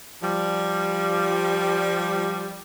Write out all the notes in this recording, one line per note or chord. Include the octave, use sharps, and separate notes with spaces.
F3 G3